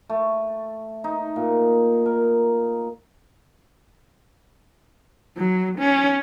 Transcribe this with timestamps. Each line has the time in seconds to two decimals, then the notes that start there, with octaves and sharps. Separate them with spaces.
0.09 A3
1.04 D#4
1.36 A#2
2.06 A#4
5.37 F#3
5.78 C#4